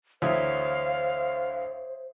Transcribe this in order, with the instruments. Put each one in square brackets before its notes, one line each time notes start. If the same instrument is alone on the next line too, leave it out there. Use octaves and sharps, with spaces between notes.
[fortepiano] D2 E3 F#3 [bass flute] C5 [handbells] C#5 E5 D#6 [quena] F5